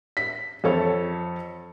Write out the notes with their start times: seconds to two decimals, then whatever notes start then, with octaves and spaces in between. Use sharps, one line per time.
0.17 B6
0.64 F2 A4 C#5